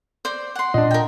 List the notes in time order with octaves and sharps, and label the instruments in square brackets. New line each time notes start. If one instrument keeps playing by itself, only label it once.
[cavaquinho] C5 D5
F#5 C6
[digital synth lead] A#2 [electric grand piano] D4 D#5
[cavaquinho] A#4 G5